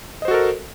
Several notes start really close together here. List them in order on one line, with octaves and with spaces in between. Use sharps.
D#5 C5 F#4 A4 A#4